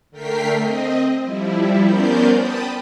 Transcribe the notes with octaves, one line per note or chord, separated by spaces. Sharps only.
D3 A3 A#4 G5 B6 C7
C4 D#5
F3 G3 E4
B3 C#4 A#4 C5 D5 G6
G5 A5 B5 D#6